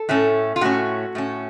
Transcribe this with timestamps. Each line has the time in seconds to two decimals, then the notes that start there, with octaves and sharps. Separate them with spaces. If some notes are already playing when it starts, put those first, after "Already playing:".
Already playing: A4
0.09 A2 A3 C#4
0.56 F4
0.61 A2 A3 C#4 F#4
1.15 A2 A3 C#4